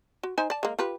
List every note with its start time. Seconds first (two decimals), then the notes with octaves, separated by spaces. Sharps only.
0.23 F#4
0.38 D#4 C5 G#5
0.50 D5 A5
0.63 G#3 A#3
0.79 F4 G4 B4